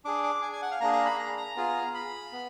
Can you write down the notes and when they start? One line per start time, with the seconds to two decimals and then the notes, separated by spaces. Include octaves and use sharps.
0.05 D4 G#4 D6
0.24 D6
0.42 G#5
0.53 G#5
0.62 F#5
0.71 F5
0.81 A#3 D4 G#4 A#5
0.93 A#5
1.05 B5
1.19 A#5
1.38 A#5
1.56 B3 F4 G#4
1.94 B5
2.32 B3